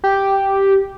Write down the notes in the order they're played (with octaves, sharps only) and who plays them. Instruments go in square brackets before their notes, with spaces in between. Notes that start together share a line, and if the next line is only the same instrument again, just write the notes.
[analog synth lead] G4